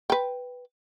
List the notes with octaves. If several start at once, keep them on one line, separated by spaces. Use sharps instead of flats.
B4 G5